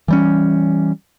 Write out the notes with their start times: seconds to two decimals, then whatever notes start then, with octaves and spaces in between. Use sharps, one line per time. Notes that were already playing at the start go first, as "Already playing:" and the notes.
0.08 E3 G3 C#4